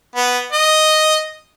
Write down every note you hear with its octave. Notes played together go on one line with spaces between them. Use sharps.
B3
D#5